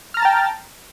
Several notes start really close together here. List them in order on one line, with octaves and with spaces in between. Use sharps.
F6 A#5 A6 A5 G5